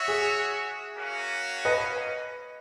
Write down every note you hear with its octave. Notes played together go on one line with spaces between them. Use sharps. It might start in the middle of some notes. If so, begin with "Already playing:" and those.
Already playing: F#4 C#5 E5
G#4
A#3 C#4 F#4
B4 D#5